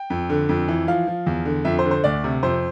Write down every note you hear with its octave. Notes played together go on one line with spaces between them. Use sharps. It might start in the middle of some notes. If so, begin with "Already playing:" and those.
Already playing: G5
F2
D3
F2
E3
F3 F5
F3
E2
D3
F2 E5
C5
D3
C5
D2 D5
C3
F2 C5